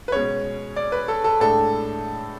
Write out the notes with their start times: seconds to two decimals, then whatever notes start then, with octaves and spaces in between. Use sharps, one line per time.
0.08 B4
0.12 B2 G#3 C#4 C#5
0.76 D5
0.92 B4
1.08 A4
1.24 A4
1.40 A2 G#3 D4 A4